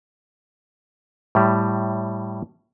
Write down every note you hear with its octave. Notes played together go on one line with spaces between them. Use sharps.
A2 G3